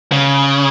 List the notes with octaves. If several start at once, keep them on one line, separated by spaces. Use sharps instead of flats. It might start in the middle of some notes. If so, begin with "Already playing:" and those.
C#3